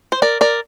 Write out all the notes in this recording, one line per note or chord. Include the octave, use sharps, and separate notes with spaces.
C5
A#4 D5
A#4 D5